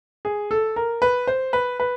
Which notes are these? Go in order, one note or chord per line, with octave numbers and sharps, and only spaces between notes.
G#4
A4
A#4
B4
C5
B4
B4